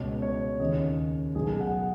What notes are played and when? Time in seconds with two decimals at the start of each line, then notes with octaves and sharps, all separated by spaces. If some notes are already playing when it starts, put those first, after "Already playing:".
Already playing: C#2 B2 C#5
0.22 C#5
0.60 D#2 C#3 D#5
1.35 B1 B2 G#4
1.60 F#5